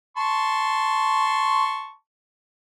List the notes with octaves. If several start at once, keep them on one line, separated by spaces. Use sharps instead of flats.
A5 C6 C#6